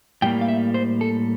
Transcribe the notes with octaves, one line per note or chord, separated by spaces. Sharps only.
A2 G3 A#3 G5
F5
E5
C5
A4